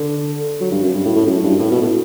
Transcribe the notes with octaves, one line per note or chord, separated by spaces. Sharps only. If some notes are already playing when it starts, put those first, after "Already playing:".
Already playing: D3
F#3
G2
F#2
G2
A2
A2
F#2
G2
A2
B2
A2